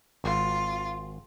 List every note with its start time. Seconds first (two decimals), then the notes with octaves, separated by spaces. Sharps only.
0.24 G#1 F4